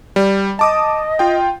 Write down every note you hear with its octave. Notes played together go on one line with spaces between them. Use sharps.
G3
D#5 A5 D6 D#6
F4 G5